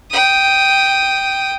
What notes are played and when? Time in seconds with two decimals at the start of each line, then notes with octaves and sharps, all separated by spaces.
0.10 G5 D#6